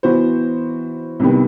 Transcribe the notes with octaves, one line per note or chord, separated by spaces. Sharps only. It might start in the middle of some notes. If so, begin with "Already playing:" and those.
E3 B3 F#4 C5
C2 C3 D#3 G3 B3